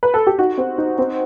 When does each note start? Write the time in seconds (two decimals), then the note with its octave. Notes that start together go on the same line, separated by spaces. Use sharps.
0.03 B4
0.14 A4
0.27 G4
0.38 D#4 F#4
0.58 C4
0.78 D#4
0.98 C4